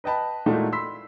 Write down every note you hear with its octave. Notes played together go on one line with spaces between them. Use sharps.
B4 D#5 G5 A5 B5
A#2 G#3 A3 D#4 E4 F#4
B5 C6 E6 B6